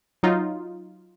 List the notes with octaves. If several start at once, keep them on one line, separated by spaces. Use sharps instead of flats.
F#3 D#4 F4